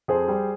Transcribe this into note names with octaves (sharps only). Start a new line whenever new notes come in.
F2 G#4 C5
G3